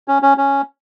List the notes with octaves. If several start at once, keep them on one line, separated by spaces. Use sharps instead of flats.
C#4
C#4
C#4